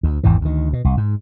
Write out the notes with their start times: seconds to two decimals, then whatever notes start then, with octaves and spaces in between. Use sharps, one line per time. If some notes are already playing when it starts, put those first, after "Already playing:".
0.03 D2
0.24 G#1 E2 G#2 E3
0.41 D2 D#3
0.73 B2
0.84 C2
0.97 G#2